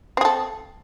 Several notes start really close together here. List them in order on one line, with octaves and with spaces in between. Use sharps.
C4 G#4 A4